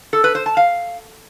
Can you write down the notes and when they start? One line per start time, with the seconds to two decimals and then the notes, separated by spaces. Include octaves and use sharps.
0.13 A4
0.24 B4
0.35 C5
0.46 A5
0.57 F5